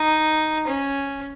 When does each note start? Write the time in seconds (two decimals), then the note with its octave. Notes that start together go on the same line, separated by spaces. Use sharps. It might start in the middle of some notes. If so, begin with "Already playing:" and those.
Already playing: D#4
0.67 C#4